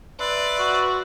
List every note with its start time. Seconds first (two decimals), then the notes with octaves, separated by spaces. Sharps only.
0.20 B4 D5 E5 C6
0.59 F#4